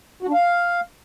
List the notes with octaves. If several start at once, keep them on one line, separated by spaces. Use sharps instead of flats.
F#4
D4
F5